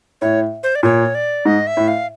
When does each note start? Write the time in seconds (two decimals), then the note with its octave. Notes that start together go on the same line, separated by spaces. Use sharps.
0.21 A2 C#5
0.63 C5
0.75 D5
0.83 A#2 C#5
1.15 D5
1.45 G#2 D#5
1.67 E5
1.77 A2
1.88 F5